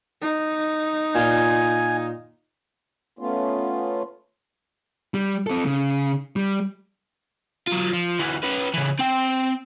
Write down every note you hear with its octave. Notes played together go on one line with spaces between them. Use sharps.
D#4
A#2 F4 G#5
A3 B3 C#4 F4
G3
C4 A4
C#3
G3
F#3 F4
F3
D2 E3
C#4 B4
C#3 E3
C4 G5